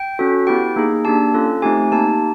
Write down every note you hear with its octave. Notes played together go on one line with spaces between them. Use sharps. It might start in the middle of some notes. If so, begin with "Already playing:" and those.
Already playing: G5
C#4 F#4 A4
B3 E4 G4 G5
A#3 D#4 G#4
A#3 D4 G4 A5
C#4 F4 A4
A3 C4 D#4 G4 G#5
A#3 D#4 G4 A5